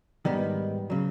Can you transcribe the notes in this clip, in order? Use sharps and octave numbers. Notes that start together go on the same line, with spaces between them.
G#2 D#3 G3 B3
C#3 F#3